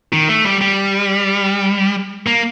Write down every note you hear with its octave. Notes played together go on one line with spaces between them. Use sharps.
D#3
A3
G3
G3
A#3